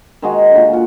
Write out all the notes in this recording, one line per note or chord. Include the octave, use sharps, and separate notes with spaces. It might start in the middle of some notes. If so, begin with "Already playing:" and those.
D#3 G#3 F#4
A#2 D3
F4 F#4